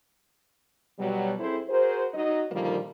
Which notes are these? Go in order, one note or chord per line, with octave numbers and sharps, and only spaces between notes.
B2 F#3 G3
C4 E4 G#4 A4 C5
F#4 G#4 A#4 C5
F#3 D#4 D#5
A#2 D3 D#3 F3 G3 A#3